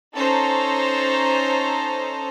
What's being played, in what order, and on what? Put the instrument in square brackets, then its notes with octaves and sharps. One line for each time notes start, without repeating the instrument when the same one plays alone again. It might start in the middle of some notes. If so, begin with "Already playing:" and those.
[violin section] C#4 D#4 A4 C5 A#5